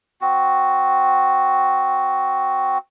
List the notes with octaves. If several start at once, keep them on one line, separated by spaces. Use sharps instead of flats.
C4 F#4